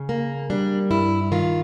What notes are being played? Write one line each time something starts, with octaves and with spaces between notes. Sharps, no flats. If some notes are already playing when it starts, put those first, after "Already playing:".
Already playing: C#3
A#3
G3 D4
G2 E4
D#3 F4